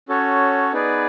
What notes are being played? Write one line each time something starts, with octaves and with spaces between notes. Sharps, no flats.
C#4 F#4 A4 C#5
B3 D#4 G#4 B4 D5